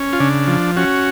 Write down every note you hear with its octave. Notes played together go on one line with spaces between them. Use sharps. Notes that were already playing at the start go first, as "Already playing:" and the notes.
Already playing: C#4
F4
C#3 D4
F3
C#4 F#4